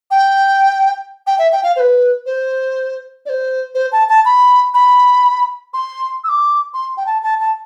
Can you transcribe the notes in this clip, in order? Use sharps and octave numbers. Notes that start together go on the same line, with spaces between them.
G5
G5
E5
G5
F5
C5
B4
C5
D5
C5
C5
A5
A5
B5
B5
C6
E6
D6
C6
G5
A5
A5
A5